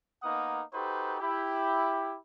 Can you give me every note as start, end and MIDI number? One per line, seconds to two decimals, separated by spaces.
0.23 0.61 58
0.23 0.61 59
0.23 0.61 63
0.23 0.61 70
0.23 0.61 78
0.23 0.61 87
0.73 1.17 63
0.73 1.17 66
0.73 1.17 67
0.73 1.17 69
0.73 1.17 71
0.73 1.17 72
1.20 2.15 64
1.20 2.15 67